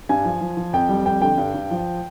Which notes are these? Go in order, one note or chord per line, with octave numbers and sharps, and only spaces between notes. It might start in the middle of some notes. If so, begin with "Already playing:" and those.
G2 G#5
F3
F3
F3
F2 G5
G3
F2 G5
D3 G5
G2
G2
F3